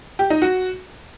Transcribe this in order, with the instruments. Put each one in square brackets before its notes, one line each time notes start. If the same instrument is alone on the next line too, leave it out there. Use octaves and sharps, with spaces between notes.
[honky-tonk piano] G4
D#4
F#4